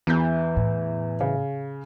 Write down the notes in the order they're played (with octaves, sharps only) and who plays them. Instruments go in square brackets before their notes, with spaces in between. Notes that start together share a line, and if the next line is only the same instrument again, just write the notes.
[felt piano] E2 G6 [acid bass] E3
[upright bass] A2
[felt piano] C#3